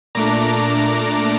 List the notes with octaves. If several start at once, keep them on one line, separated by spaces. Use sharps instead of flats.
A#2 A3 D4 A#5 D6